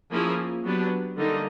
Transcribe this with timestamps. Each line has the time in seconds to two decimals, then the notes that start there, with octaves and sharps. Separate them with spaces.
0.11 F3 A#3 C#4 E4 G#4
0.64 F#3 B3 D4 G4 B4
1.17 D3 G3 A#3 D#4